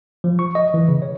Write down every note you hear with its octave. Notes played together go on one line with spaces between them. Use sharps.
F3
C#6
D#5
E3
C#3
C#5